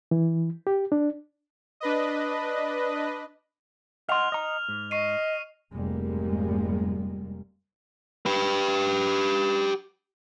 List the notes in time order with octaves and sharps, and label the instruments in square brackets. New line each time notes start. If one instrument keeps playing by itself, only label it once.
[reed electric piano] E3
G4
D4
[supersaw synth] D4 B4 D#5
[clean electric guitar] D#5 F#5 C6 [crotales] F6 F7
[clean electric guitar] D#5 A#5
G#2
[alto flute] D#5 [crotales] C#6 C7 D#7
[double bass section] F1 G#2 G3 G#3 A#3
[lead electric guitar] G4 B4